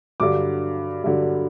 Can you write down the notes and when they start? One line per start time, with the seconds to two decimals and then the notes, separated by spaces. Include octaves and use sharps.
0.20 G2 D3 F#3 D6
1.04 G2 D3 F#3